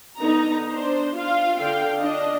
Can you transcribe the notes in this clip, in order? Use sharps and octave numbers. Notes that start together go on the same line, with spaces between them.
D3 B3 D#4 A#5
D4 C5
F4 F5
D3 F5 G5
D4 D#5